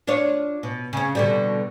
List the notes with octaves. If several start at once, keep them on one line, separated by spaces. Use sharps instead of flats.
D4 F4 C#5
B2
C#3 C#4
B2 D3 G3